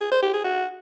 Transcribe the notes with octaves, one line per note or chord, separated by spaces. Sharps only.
G#4
C5
G4
G#4
F#4